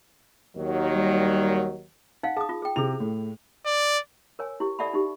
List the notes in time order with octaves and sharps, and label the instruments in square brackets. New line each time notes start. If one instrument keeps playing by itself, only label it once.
[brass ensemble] D#2 D#3 F#3
[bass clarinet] G3
[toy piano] D#4 F5 [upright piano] F#5
[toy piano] G#4 D#6 [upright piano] A5
[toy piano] F4
G#4 G5
[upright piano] C3 F7 [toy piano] E4 G#4
[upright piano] A2
[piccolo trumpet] D5
[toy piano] A#4 C#5 G#5
E4 G4
A4 D5 E5 F#5 A5 B5
D#4 G4